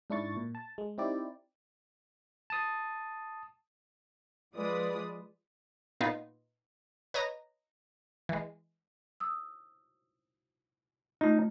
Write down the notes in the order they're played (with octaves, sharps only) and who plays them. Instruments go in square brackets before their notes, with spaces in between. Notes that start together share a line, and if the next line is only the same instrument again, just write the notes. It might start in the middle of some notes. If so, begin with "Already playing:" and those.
[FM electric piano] G#2 D4 E4 C#6 A6
A#2
A5
G#3
C4 D#4 E4 G4 D5
[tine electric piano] A5 D#6
[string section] F3 G#3 F4 B4 D5 D#6
[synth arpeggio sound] A#2 B3 D#4 F4
B4 C#5 D#5 A#5
E3 G#3
[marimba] D#6 E6
[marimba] A3 F4 [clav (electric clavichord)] D#4